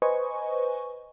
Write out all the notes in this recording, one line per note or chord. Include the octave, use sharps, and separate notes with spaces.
B4 C5 D#5 G#5 C#6